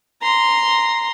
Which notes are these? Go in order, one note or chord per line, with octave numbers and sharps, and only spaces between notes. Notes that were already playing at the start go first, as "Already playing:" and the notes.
A#5 C6